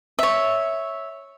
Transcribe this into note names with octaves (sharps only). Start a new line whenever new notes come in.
C#5 E5